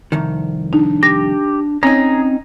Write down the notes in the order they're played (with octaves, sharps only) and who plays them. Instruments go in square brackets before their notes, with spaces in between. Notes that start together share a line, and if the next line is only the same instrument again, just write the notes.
[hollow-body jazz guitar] C2 F2 D#3
[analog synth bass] D4 [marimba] D#4
[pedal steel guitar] G4 [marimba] A#6
[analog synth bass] C4 [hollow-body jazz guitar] C#4 D#4 [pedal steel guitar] G#4 A#5